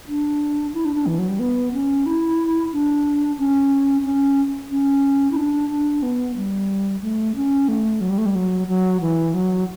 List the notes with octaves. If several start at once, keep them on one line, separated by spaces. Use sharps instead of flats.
D4
E4
D4
D4
E3
F#3
G3
B3
C#4
E4
D4
C#4
C#4
C#4
E4
D4
D4
B3
G3
A3
C#4
A3
F#3
G3
A3
G3
F#3
F#3
E3
F#3